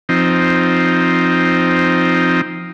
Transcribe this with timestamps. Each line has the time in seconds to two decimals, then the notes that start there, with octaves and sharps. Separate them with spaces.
0.09 F3 C4 D#4